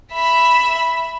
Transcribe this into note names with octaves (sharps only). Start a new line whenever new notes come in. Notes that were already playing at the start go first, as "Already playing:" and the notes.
E5 B5